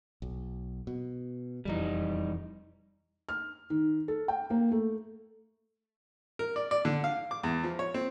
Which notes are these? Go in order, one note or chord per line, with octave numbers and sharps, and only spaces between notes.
B1
B2
E1 F2 E3 G3 D#4
F6
D#3
A4
G5
A#3
A3
A#4
D5
D5
D3
F5
D6
E2
F3
C#5
C4